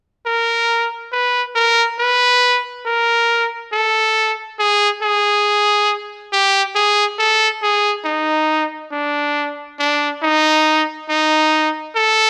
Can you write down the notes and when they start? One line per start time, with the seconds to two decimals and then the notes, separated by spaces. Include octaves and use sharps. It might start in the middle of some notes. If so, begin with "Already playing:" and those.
0.26 A#4
1.12 B4
1.55 A#4
1.99 B4
2.86 A#4
3.73 A4
4.59 G#4
5.02 G#4
6.32 G4
6.75 G#4
7.19 A4
7.63 G#4
8.05 D#4
8.92 D4
9.79 D4
10.22 D#4
11.09 D#4
11.96 A4